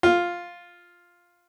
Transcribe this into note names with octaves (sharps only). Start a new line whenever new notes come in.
F4